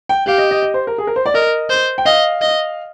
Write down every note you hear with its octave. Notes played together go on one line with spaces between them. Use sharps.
G5
G4 F5
D#5
D#5
D#5
C5
A#4
G#4
A#4
C5
D5
A#4 D#5
C5
G5
D#5 F5
D#5